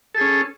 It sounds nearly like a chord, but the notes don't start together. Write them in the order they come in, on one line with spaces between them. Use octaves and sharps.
A4 G#4 C#4